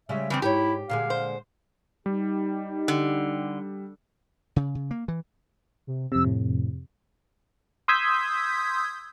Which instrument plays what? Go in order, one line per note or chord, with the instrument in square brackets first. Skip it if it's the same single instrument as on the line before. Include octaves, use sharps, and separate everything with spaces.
[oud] C#3 G3 G#3 [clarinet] E5
[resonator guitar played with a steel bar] C#3 G3 C4 [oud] E3
[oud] G#2 A#4 C#5 [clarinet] E4 [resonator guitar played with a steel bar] G4
[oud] A#2 D3 G#3 [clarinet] F5
[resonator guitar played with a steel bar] C5
[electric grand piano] G3 [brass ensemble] D#4 G4
[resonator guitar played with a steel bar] D3
[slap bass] C#3
C#3
A#3
E3
[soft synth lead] C3
[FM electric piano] F2 C3 [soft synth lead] E6
[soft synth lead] A2
[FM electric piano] C6 D#6 E6 G6 G#6 B6